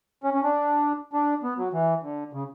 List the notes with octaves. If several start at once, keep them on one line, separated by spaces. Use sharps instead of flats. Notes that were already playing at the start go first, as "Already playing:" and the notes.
C#4
C#4
D4
D4
B3
F#3
E3
D3
C#3